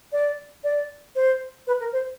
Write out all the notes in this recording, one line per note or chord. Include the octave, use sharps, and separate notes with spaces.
D5
D5
C5
B4
A#4
C5